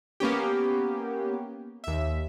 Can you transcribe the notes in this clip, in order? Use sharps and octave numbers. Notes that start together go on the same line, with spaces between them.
A#3 B3 C#4 G4
D#2 E5